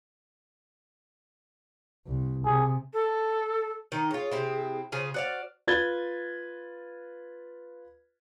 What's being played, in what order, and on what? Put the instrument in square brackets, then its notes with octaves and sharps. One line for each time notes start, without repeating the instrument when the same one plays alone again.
[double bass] C2
[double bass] C3 [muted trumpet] G#4
[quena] A4
[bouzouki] D#3 D#4
[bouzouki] F4 C#5 [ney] G#4
[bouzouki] C3 C4 E4
[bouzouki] C#3 F4 G#4 [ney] C5
[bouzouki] F#4 D5 F5 [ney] C5
[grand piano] F4 B4 G#6 A6 G7